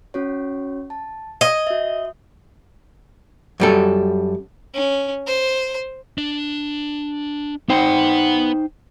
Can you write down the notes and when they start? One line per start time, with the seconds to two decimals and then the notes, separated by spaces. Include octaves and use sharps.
0.14 C#4 F#4 C#5
0.90 A5
1.41 D#5 G#6
1.67 F#4 E5
3.60 F#2 G3 A4
4.74 C#4
5.27 C5
6.18 D4
7.69 B3 D#4 C5 F#5 G5